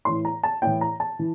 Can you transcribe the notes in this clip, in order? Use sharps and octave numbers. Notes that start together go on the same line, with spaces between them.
A2 E3 C6
A#5
A5
A2 E3 G5
A#5
A5
E3